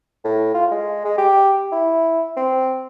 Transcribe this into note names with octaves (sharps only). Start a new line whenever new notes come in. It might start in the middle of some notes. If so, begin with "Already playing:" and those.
A2
F4
G#3
G#3
G4
E4
C4